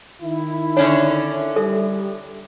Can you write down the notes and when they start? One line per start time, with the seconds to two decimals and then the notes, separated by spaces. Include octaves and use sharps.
0.22 D#3 E4
0.77 D3 C#4 D4 C#5
1.56 G3 A4 E5